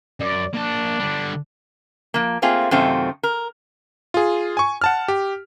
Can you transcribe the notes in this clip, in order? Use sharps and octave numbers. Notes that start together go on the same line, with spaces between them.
F#2 D5
A#3 D4 A5
D3 G3
F3 A#3
A3 A#3 C4 F4 G#4
F#2 C3 D#3 A3 C4 F4
A#4
F4 G#4
G#5 C#6
F#5 A5 F6
G4